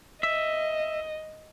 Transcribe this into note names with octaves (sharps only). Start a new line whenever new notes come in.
D#5 E5